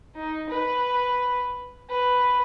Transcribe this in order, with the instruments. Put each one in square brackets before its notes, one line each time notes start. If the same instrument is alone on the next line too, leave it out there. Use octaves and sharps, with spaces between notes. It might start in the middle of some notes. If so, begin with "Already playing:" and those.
[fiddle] D#4
B4
B4